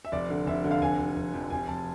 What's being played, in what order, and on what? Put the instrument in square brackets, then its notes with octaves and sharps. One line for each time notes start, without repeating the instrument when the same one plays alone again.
[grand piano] E5
F1 D5
D3
F1 E5
D3
F5
F1 G#5
F1
F1
F2
F1 G#5
F1 A5